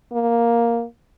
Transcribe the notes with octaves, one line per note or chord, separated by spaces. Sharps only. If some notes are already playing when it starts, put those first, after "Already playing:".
A#3